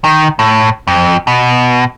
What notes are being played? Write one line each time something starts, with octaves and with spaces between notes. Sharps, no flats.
D#3
A2
F2
B2